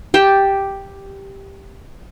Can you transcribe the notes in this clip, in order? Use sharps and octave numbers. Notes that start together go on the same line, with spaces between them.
G4 G5 A5